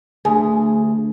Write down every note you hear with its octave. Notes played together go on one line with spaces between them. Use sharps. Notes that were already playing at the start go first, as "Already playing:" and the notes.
D2 G#4